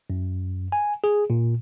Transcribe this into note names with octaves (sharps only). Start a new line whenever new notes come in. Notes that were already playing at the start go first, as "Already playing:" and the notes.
F#2
G#5
G#4
A#2